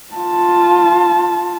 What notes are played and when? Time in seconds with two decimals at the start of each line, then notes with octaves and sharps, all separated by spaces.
0.14 F4 A5